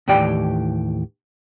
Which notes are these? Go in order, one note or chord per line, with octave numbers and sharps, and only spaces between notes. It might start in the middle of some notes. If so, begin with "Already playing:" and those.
D#2 A2 E3 G4 D5 G5